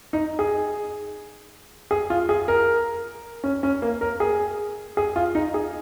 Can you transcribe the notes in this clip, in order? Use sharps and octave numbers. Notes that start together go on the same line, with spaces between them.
D#4
G#4
G#4
F4
G#4
A#4
C#4
C#4
A#3
A#4
G#4
G#4
F4
D#4
G#4